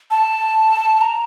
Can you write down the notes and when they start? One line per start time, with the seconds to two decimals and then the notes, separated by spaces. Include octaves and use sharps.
0.11 A5
1.01 A#5